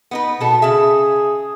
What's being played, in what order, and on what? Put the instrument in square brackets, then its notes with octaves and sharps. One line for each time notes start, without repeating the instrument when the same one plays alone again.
[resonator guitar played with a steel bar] B3 D#4 B4
[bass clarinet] B2 [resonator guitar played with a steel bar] B3 A4
[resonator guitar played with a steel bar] C#3 E5 [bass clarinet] G#4